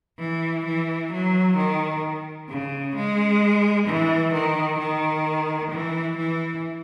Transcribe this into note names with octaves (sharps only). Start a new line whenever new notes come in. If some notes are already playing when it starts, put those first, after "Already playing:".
E3
E3
F#3
D#3
C#3
G#3
E3
D#3
D#3
E3
E3